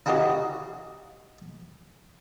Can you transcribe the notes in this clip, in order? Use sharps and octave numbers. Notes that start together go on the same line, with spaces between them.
D#4 E4 F#4 G4 D#5 F5